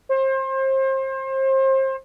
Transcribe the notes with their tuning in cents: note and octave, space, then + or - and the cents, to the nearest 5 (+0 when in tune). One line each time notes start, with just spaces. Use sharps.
C5 +30